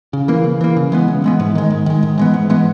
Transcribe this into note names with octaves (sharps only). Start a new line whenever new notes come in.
C#3
E3 A#3
C#3
E3 A#3
C#3
E3 G#3 B3
C#3
E3 G#3 B3
G#2
D#3 G#3
G#2
D#3 G#3
G#2
E3 G#3 B3
G#2
E3 G#3 B3